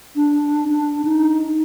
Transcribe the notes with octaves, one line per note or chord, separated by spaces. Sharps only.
D4
D4
D#4